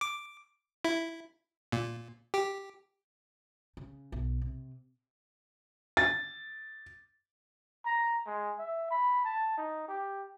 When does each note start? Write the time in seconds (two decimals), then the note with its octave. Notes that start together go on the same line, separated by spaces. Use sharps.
0.01 D6
0.85 E4
1.72 A#2
2.34 G4
3.77 C#3
4.12 B1
4.41 C3
5.97 A6
7.86 A#5
8.26 G#3
8.59 E5
8.91 B5
9.25 A5
9.57 D#4
9.88 G4